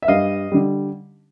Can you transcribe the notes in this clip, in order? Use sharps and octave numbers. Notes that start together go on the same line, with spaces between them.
E5
G2 D#5 F5
D3 G3